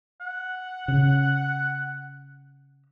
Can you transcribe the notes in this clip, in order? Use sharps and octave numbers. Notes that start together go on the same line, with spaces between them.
F#5
C#3